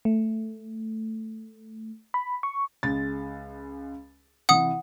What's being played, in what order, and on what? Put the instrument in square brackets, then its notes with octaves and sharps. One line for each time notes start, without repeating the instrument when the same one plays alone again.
[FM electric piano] A3
B5
C#6
[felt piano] C#2 G#3 A6
[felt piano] C3 E3 [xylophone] F#5 D#6